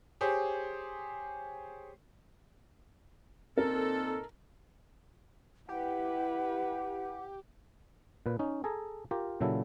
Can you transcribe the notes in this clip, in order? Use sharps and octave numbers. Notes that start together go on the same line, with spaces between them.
G4 G#4 C5 C#5
A#2 C4 D#4 A4 A#4
E4 G4 B4 F#5
A#2 B4
C#4 D#4
G#4 A4 G#5 A#5
F4 G4 A#4
A#2 C#3 F#3 E4 A4